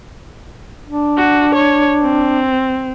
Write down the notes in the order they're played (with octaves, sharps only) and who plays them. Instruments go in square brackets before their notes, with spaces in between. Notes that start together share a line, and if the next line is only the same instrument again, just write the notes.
[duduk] D4
[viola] F#4
C#5
C4